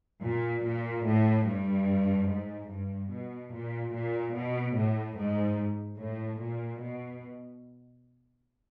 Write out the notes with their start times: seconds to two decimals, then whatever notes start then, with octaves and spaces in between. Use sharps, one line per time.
0.22 A#2
0.64 A#2
1.05 A2
1.45 G2
2.27 G#2
2.69 G2
3.10 B2
3.52 A#2
3.93 A#2
4.33 B2
4.75 A2
5.16 G#2
5.98 A2
6.39 A#2
6.80 B2